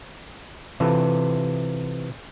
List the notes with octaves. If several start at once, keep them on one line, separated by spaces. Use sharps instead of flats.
C3 E3 F4 A4 B4